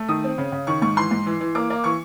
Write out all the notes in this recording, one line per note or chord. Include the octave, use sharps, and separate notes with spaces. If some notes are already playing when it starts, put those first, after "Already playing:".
Already playing: A3
D#3 D#6
C4
C#3
C#3
D#3 C#6
G#2 C#6
E3 C6
G#2
E3
E3
A#3 D6
A#3
E3 C#6